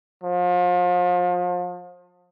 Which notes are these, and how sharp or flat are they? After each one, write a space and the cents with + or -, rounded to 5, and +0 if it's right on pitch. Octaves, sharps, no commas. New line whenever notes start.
F3 +35